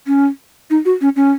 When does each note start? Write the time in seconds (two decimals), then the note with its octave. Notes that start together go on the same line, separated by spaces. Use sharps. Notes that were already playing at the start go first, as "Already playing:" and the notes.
0.07 C#4
0.70 D#4
0.85 F#4
1.01 C#4
1.16 C#4